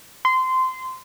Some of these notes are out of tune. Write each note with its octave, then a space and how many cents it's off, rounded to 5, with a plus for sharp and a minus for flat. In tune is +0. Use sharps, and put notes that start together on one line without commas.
C6 -20